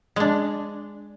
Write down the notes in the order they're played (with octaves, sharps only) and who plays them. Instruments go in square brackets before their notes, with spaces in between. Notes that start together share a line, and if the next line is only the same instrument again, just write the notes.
[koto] G#3 D4